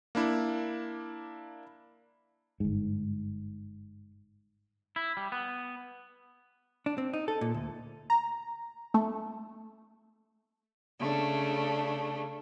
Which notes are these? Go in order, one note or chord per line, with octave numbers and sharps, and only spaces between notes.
A#3 D4 E4
G1 G#2
E4
G3
B3
D4
C4
D#4
A4
A#2
D2
A#5
A3
C#3 A3 D4